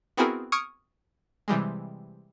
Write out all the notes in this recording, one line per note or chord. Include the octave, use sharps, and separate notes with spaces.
B3 C4 E4 F#4 G#4 A#4
C#6 D#6 F6 G#6 C#7 D7
C3 E3 G3 G#3